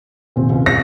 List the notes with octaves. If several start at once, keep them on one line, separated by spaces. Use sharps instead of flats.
D#1 C4
C#2
A#6